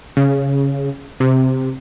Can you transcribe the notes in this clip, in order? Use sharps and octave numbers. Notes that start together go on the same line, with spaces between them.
C#3
C3